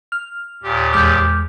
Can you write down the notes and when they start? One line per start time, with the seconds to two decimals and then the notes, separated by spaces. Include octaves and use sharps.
0.12 F6
0.63 D#2 A#2 G4
0.93 E2 G#3 D6 F6 G6